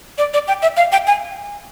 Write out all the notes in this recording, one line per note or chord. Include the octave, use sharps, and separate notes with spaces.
D5
D5
G5
E5
F5
G5
G#5